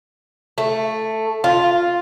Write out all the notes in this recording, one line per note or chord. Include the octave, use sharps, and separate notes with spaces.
A3
F4